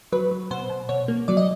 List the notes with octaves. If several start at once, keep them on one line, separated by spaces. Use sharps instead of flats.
F#3 B4
F#3
B2 C5
B2
B2 C#5
A#3
F#3 D5
D#5